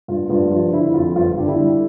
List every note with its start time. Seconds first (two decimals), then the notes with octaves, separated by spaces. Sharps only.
0.08 G2 F4
0.30 G2 F4
0.51 F3 F4
0.73 D3 E4
0.94 F2 F4
1.16 G1 F4
1.37 D3 G4
1.48 E4
1.59 G3